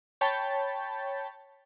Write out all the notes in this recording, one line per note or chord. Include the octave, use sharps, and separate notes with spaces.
C#5 G5 A5 B5